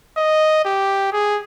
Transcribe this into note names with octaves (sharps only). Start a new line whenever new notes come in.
D#5
G4
G#4